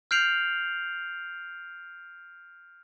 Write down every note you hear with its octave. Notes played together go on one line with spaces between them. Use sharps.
F6 G6 C7 D7 F7 F#7